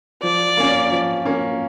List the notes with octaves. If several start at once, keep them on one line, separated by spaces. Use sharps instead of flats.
F3 D5
A#3 C#4
F3
A#3 C#4